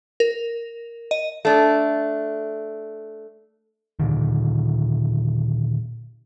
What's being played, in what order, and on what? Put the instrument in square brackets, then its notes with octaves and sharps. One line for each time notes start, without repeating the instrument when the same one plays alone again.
[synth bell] A#4
D#5
[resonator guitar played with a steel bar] A3 D4
[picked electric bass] A#2 D3 D#3